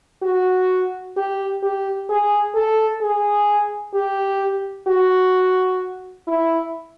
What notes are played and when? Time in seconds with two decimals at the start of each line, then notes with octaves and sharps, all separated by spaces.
0.22 F#4
1.17 G4
1.63 G4
2.09 G#4
2.55 A4
3.01 G#4
3.94 G4
4.88 F#4
6.27 E4